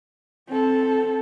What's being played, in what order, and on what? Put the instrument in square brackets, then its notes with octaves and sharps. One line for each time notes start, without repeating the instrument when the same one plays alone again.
[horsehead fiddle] C4 A4